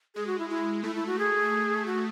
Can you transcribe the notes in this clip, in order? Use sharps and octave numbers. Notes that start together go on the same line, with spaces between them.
G#3 G#4
F#4
E4
G#3 E4
A3 E4
E4
F#4
G#4
F#4